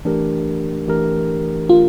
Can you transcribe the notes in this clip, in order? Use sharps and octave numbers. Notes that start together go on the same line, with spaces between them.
E3 A3 D4 G4 A#4
E3 A3 D4 G4 A#4
E3 A3 D4 F4 G4 A#4